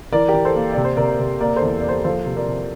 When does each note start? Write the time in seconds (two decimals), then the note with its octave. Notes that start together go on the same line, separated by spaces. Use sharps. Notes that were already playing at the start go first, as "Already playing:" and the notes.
0.12 E3 A#4 D5
0.28 G4 A#4
0.34 E3
0.45 A4 C5
0.56 A#3
0.73 C3 D5
0.84 C5
0.97 C3 A#4 D5
1.19 C3
1.41 A#3 A#4 D5
1.56 A4 C5
1.62 E2
1.80 A#3 D5
1.88 A4 C5
2.04 F3 A4 C5
2.26 C3
2.36 A#4 D5
2.48 C3